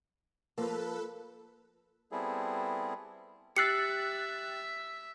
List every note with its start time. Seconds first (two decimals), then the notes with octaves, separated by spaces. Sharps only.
0.57 F3 A#3 A4 B4
2.12 G3 B3 C4 E4 G#4 A4
3.57 G4 E5 E6 F#6 A6 C7 C#7